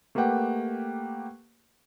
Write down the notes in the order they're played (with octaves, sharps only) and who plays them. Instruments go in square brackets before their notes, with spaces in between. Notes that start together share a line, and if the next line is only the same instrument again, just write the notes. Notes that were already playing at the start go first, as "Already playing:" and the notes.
[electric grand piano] A3 A#3 G4 B4 F#5 G5